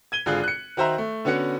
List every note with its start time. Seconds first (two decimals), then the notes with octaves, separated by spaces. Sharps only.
0.12 G#6 D#7 G7
0.26 G#1 D3 F4 G#4 F#6
0.44 F#6 C#7
0.77 D#3 F#4 C5 E5 A#5
0.98 A3
1.25 D3 B3 C#4 F#4 C#7